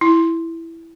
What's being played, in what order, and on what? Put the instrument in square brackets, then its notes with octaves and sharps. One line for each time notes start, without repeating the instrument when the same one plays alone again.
[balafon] E4